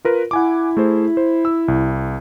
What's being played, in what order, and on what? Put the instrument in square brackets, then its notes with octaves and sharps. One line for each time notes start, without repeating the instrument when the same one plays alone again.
[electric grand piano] F4 A#4 B4
[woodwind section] E4 [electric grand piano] F#5 G#5 D6
[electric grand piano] A3 G#4 C5
C5
E6
C2